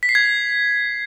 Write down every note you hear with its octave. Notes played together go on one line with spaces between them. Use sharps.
B6
C7
G#6